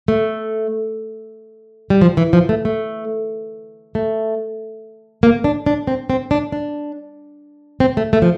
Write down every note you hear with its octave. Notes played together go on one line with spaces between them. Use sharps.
A3
G3
F3
E3
F3
A3
A3
A3
A#3
D4
D4
C4
C4
D4
D4
C4
A3
A3
F3